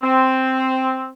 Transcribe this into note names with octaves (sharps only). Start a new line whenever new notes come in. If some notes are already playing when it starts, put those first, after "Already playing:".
C4